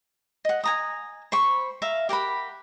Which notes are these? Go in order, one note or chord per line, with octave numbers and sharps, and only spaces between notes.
D#5 F#5
G#5 A#5 D#6
C5 B5 C#6
E5 F5 A#5
G4 A#4 F#5 B5